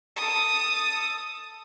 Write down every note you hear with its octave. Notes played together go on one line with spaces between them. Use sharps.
A4 D#6